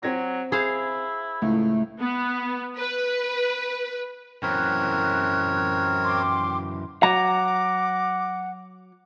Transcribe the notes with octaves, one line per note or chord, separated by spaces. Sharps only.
F#3 C4 G#6 A#6
E4 G#4 C5 F5
C#2 A2 A3
B3
B4
F#2 E3 C4 A#4 C#5 F#6
G5 C6 D6
F#3 F#5 A#5 D6